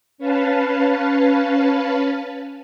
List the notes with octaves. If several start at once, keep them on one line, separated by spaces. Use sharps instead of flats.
C#4 B4 F5 A5